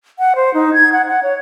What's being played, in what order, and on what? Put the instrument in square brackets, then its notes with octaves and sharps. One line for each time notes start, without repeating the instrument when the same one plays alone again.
[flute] F#5
C5
D#4
G#6
F#5
F#5
C#5